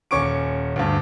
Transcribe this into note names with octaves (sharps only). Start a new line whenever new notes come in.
D#1 C#4 C#6 D6 D7
D2 G2